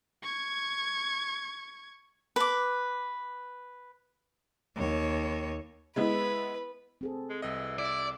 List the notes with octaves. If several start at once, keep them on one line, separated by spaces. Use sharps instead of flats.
C#6 G#6
B4 D6
D#2 C#5
G#3 B3 E4 B4
C4 G#4 A4
G#3
C2 E3 D#5
E4 D5